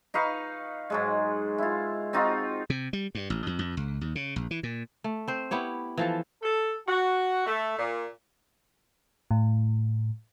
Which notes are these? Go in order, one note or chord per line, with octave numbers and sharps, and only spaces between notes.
D#4 B4 F5 C#6
G#2 F#3 G#3
E4 F4
C4 D#4 F4 F#4
C3
G3
G2
A1
F2
F2
C#2
D#2
C#3
A#1
E3
A#2
A3
C4 C5
B3 E4 G4 C#5
E3 F3 A4
A4
F#4
A3
A#2
A2